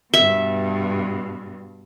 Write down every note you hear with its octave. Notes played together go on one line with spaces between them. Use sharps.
G2 B2 E5